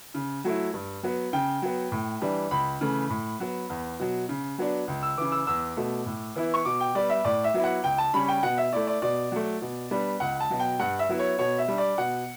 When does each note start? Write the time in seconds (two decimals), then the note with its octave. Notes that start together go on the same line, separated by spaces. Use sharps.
0.14 C#3
0.44 F#3 A3 E4
0.74 G2
1.03 F#3 B3
1.33 C#3 G5
1.62 F#3 B3
1.92 A2
2.21 E3 G3 D4
2.51 C#2 B5
2.81 C#3 E3 A3
3.10 A2
3.40 F#3 B3
3.70 E2
3.99 B2 F#3
4.29 C#3
4.58 F#3 B3 D4
4.88 C#2
5.03 E6
5.17 C#3 E3 D6
5.32 E6
5.47 E2 E6
5.77 B2 A3
6.06 A2
6.36 E3 B3 E4
6.54 C#6
6.65 B2 D6
6.80 G5
6.95 G3 B3 D5
7.10 E5
7.25 A2 D5
7.44 E5
7.54 F#3 B3 E4
7.64 F#5
7.84 C#2 G5
7.98 A5
8.13 C#3 G3 C#4 B5
8.28 G5
8.43 B2 F#5
8.58 E5
8.72 A3 E4 D5
8.87 D5
9.02 B2 D5
9.32 F#3 A3
9.61 B2
9.91 G3 B3 D4
10.20 C#2 F#5
10.40 A5
10.50 B2 F#3
10.60 G5
10.79 G2 F#5
10.99 E5
11.09 F#3 B3 E4
11.19 C#5
11.38 B2 C#5
11.58 E5
11.68 G3 D4
11.78 D5
11.98 B2 F#5